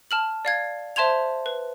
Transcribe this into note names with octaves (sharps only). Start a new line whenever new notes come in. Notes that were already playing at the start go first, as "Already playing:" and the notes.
A5 F6 F#7
D5 F5 G#6
C5 E5 A5 C6 G#6 F7
B4